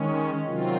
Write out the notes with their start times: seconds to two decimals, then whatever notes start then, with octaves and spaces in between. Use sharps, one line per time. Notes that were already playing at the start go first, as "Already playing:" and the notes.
Already playing: D#3 G#3 C#4
0.43 C3 D#3 F#3 C4 F4